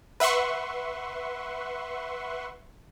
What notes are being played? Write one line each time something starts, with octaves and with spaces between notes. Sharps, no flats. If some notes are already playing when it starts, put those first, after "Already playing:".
B4 E5 F#5 C6 C#6